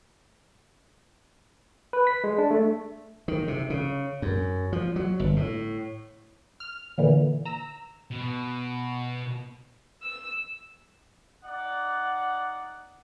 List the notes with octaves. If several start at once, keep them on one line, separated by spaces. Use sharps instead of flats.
B4
B6
G#3
D4
A3
D#3
C3
C#3
F#2
F3
F#3
G1
A2
F6
A#2 D3 E3
A#5 E6
B2
E6
D#4 D5 F#5